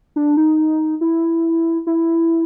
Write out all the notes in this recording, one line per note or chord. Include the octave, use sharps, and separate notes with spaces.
D4
D#4
E4
E4